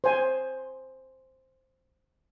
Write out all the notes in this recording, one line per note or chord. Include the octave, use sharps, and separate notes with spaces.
C5 G#5